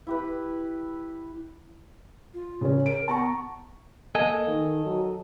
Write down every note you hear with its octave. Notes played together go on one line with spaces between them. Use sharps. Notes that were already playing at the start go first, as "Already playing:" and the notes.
E4 G4 B4
F4
C#3 C#4
A#4 D7
B3 A5 A#5 C#6
A#3 A4 D#5 G#5
D#3
F#3